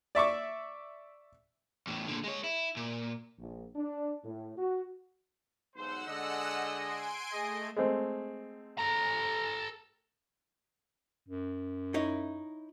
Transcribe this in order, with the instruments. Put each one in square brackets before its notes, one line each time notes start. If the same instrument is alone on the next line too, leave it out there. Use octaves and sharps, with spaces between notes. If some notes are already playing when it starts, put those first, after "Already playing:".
[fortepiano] D5 E5 C#6 D6
[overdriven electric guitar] E2 A2
A#2 D3
G#3 C#5
E4
A#2
[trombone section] A#1
D4
A2
F#4
[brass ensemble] B1 G#2 C5 [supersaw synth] F#5 E6
[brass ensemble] D3 G#3 D#5
[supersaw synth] G#5 C6 D7
[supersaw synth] A3 [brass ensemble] G#4 D#5
[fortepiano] G#3 A3 C4
[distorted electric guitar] A4 A#5
[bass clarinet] F#2
[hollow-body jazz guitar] D#4 E4 C#5